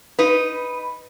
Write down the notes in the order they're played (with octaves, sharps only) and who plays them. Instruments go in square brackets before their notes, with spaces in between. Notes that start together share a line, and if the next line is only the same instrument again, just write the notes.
[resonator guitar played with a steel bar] D#4 B4